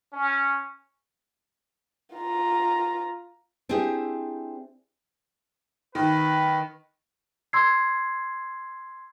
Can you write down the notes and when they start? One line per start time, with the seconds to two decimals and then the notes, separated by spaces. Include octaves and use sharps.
0.13 C#4
2.14 F4 A#5
3.69 C4 D4 E4 G4 G#4
5.95 D#3 B4
7.53 C6 E6 G#6 C7